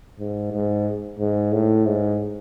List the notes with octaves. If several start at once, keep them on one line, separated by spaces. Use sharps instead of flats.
G#2
G#2
G#2
A2
G#2